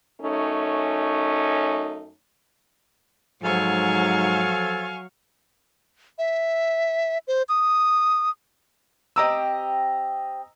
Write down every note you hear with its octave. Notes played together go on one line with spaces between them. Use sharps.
F#2 A3 C#4 D#4
G#2 F3 F#3 A4 F5 G#5 C#6
E5
C5
D#6
C4 G4 D#5 A#5 D#6 E6